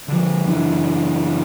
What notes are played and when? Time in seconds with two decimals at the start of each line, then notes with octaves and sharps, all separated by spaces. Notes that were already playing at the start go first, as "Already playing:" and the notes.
0.08 D3 F3
0.47 F#1 E3 D4